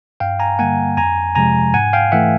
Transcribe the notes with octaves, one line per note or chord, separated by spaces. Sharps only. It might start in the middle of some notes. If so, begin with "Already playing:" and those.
G2 F5 G5
G#5 A#5
D3 G3 A#3 F#5 G#5
F2 G#5 A#5
C3 F3 G#3 G#5 A#5
G#2 F#5 G#5
F5 G5
E3 A3 E5 F#5